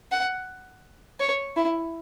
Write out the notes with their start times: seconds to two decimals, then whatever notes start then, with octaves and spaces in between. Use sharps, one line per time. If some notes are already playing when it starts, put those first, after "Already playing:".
0.11 F#5
1.20 C#5
1.56 E4